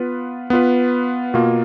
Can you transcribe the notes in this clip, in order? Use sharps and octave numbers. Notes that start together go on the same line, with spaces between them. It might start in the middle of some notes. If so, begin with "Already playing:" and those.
Already playing: B3 F4 B4
B3 F4 B4
B2 A#3 F4